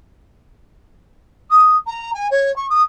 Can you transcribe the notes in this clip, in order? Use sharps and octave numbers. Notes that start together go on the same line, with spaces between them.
D#6
A#5
G#5
C#5
C#6
D#6